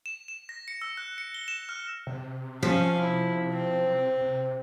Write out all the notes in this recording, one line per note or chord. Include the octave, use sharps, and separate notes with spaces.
E7
E7
A#6
C#7
E6
F#6
C#7
G7
E7
F6
C3
F3 C#4 F5
E4
C4
C3